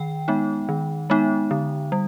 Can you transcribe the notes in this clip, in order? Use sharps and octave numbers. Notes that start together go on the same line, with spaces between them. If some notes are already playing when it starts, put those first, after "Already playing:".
Already playing: D#3 G5
G#3 B3 D#4
D#3
G#3 B3 D#4
D3
G3